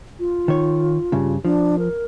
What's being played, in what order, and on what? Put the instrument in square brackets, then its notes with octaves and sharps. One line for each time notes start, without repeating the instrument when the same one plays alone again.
[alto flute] F4
[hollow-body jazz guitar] D#3 C#5
G2 C#3
[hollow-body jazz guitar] F3 [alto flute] D4
[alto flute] A#4